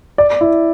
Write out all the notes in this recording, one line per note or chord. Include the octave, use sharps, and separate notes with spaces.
D5
E4